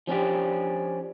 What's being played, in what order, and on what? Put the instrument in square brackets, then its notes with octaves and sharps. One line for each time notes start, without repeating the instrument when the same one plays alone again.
[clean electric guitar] F3 C#4 D4 G4